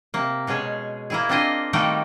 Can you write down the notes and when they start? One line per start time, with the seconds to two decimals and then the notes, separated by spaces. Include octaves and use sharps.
0.14 C3 A#3
0.47 B2 G#3 C#4 G#4
1.10 A#3 E4 G#4
1.29 C4 D4 F4 C5 D#5
1.73 D#3 G3 A3 A#3 F#4 G5